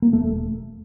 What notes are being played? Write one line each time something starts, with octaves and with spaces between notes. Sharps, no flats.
A#3
E1 A3